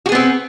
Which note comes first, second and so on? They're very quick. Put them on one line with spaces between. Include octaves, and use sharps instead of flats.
F#4 G#4 B3 C4